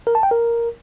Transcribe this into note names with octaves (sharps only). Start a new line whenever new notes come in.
A#4
A5
G5
A#4